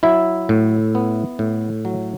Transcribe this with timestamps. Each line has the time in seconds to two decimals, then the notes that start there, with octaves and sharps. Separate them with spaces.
0.03 F#3 E4 E5
0.49 A2
0.95 B3
1.39 A2
1.85 F#3